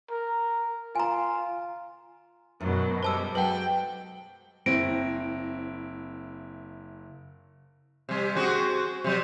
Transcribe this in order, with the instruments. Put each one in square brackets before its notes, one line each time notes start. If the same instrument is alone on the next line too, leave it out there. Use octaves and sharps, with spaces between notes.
[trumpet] A#4
[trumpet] F4 [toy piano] G#5 A#5
[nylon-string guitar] F#2 [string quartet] B2 D#3 F#3
[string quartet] G3 G#3 [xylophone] C5 A5 E6
[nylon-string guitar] F#3 G#3 [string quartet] A4 [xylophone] B4 F#5 [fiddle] G5
[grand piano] F#1 E4 A#6 [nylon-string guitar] C4 [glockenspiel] D7
[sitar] C3 G3
C4 F#4 G#4
C3 F#3